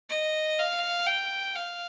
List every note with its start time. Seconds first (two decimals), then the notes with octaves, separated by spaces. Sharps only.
0.10 D#5
0.59 F5
1.07 G5
1.55 F5